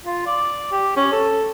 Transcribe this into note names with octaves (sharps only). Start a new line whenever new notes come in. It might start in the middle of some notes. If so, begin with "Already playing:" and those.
F4
D5
G4
C#4
A4